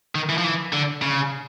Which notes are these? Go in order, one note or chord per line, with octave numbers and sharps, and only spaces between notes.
D#3
E3
F3
E3
D3
C#3